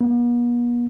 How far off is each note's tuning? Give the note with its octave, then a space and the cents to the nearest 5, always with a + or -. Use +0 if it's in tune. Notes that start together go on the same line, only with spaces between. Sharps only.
B3 -45